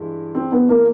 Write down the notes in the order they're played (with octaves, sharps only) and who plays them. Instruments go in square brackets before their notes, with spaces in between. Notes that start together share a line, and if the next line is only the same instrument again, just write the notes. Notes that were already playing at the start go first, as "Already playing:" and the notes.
Already playing: [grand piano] G2 E3 G#3
[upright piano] C4
B3
A#3